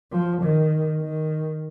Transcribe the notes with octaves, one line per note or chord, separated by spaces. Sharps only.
F3
D#3
D#3